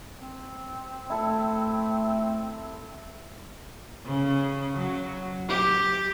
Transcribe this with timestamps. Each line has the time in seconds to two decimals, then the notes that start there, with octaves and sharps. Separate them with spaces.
0.15 C4
1.10 A3 E4 A4
4.05 C#3
4.77 F#3
5.49 G4